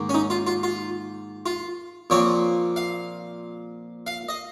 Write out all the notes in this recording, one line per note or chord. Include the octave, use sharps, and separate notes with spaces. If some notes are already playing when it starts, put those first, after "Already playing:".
Already playing: G#2 D#3 A#3
C#4
D#4
F4
F4
F4
F4
A#2 F3 C4 C#5
F5
F5
D#5